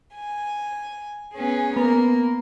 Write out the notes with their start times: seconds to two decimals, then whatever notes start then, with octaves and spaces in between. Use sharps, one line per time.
0.15 G#5
1.35 B3 C#4 G#4
1.76 A#3 B3 A#4